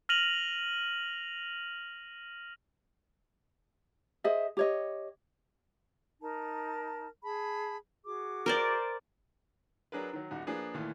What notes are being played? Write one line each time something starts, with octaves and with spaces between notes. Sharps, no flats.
F6 A#6 D#7 F7 F#7
G#4 C5 D#5 E5
G4 C#5 D#5
D#4 A#4 A5
G#4 A5 B5
F#4 G#4 D6
A#4 C5 D5
F#3 D4 G#4 A#4 B4
D#3 F#3
D#1 D#4 F#4
F3 A#3 D4 G#4 B4
D#2 A#2 E3 A3